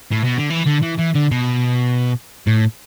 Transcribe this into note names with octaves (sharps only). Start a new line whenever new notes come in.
A2
B2
D3
E3
D3
E3
E3
D3
B2
A2